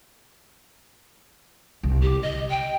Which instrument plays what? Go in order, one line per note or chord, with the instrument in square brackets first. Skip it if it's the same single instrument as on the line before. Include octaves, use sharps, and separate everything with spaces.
[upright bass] C2
[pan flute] G4
[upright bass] C2 [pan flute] D#5
[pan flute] G5